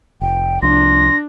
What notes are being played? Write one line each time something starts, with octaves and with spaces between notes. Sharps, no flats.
F1 G5
C2 F3 D4 C6 A#6